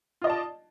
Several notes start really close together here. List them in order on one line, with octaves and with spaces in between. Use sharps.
F4 D#5 D5 A5